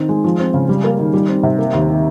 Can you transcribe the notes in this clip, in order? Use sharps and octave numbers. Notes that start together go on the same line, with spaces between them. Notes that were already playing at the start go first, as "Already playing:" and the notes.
Already playing: D#3 C4
G#3
F3
C4
C#3
G3
A#3
D#3
G3
C4
C3
A#3
D#2
D#3